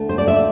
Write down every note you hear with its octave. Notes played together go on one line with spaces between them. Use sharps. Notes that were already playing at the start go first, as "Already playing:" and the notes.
Already playing: D2 A3
C5
D5
E5